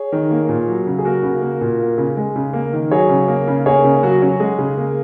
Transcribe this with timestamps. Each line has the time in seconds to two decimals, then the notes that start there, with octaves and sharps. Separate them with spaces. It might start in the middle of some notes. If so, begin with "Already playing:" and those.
Already playing: G#4 C#5
0.12 D#3
0.31 A#3
0.49 A#2
0.68 F#3
0.87 C#3
0.99 G#4
1.05 A#3 F#4 A#4
1.23 C#3
1.42 A#3
1.61 A#2
1.80 A#3
1.98 C#3
2.17 G#3
2.36 C#3
2.53 A#3
2.73 D#3
2.91 F#3 G#4 C#5
3.09 C#3
3.28 A#3
3.48 C#3
3.66 A#3 G#4 C#5
3.85 C#3
4.03 F#3 F#4
4.22 C#4
4.28 F#4
4.40 G#3 G#4
4.58 C#3
4.77 A#3